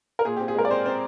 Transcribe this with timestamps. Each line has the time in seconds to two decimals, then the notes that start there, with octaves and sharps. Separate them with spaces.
0.19 A#4
0.25 A#2 G#4
0.37 G4
0.40 C4
0.48 G#4
0.55 G#3 A#4
0.65 D5
0.70 C4 C5
0.85 C4 C5